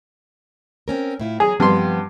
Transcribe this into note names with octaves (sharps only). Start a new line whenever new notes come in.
C4 C#4 A#4
A2 E4 F4
F#3 G#4 A#5
G2 F3 B3 C4 C6